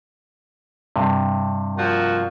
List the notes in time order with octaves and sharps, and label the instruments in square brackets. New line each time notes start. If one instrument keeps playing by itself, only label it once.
[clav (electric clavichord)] G2 C3
[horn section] A#2 F3 F#4